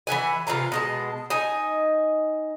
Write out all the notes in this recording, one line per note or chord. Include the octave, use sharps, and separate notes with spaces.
E3 E5 F#5 G#5
C3 E3 F4 A#5
B2 G#3 A5
D#4 G#5